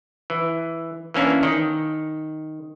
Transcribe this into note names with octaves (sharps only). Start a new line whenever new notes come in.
E3
E3 A#3 C#4 D4
D#3